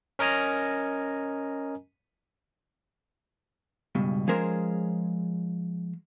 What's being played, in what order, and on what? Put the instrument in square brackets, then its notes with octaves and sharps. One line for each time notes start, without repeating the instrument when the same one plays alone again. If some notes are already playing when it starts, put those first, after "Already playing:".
[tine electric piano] C#4 A#4 D#5 G#5 A#5
[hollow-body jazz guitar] C#2 G2 B2
F3 G#3 C#4 G#4 A#4 C5